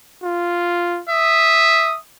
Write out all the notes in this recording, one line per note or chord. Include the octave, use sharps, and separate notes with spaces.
F4
E5 D#6